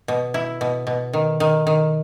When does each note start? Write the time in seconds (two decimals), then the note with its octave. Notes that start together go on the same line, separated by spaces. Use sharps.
0.08 B2
0.34 E4
0.61 B2
0.87 B2
1.13 D#3
1.40 D#3
1.67 D#3